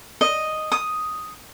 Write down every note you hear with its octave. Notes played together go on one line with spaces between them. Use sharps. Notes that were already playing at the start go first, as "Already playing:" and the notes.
D#5
D#6